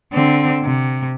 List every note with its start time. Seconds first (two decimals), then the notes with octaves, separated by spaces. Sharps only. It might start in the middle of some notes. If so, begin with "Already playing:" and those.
0.13 D3 C4
0.64 C3